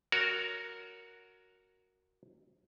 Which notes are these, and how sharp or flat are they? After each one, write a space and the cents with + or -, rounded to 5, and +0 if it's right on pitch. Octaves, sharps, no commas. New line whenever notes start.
F#4 -5 A#4 +0 C#5 +25